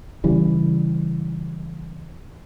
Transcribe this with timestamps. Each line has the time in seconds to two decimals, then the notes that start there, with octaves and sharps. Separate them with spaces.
0.24 C#3 E3 G3